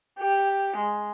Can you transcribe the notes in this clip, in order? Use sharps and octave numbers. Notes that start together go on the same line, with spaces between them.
G4
G#3